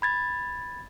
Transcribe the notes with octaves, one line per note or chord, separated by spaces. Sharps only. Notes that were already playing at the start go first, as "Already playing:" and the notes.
B5 G#6 A6